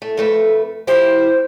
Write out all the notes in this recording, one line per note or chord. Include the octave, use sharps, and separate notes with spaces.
A3
F2 A3 B4
F3 E4 G4 C5